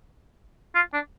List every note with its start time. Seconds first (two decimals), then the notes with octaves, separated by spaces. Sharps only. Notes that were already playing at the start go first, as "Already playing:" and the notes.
0.75 F4
0.94 D4